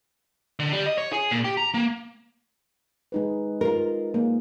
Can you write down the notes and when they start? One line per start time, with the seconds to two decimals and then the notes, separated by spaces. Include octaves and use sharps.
0.59 D3
0.72 G3
0.86 D#5
0.98 C#5
1.13 G#4
1.31 A#2
1.44 G4
1.57 A#5
1.74 A#3
3.12 G#3 D#4 B4
3.61 F4 A#4
4.14 G#3 A#3